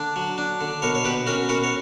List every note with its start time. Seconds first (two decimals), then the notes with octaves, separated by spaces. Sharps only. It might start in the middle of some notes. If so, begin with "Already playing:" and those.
Already playing: D3 D4
0.16 F#3
0.38 D4
0.61 D3
0.82 B2 A#4 C#5
0.95 C#5
1.04 B2 G4 B4
1.27 C#4 F#4 A#4
1.49 B2 F#4 A#4
1.64 C#5